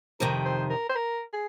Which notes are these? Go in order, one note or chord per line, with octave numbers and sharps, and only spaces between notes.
F2 C3 D#3 A#4
C5
A#4
C5
A#4
G#4